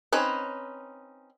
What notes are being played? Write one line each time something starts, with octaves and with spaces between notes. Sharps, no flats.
C4 C#4 D#4 B4